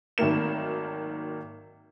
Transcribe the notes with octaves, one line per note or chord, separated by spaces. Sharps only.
G#1 D#3 F#3 A3 A#3 E7